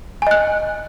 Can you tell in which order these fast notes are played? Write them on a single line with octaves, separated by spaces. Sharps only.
G#5 D#5 F#6